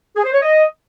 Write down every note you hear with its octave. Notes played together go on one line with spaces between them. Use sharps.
G#4
C5
C#5
D#5